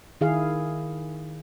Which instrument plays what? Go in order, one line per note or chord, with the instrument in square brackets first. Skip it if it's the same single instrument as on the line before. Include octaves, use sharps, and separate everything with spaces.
[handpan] D#3 E4 G#4 F5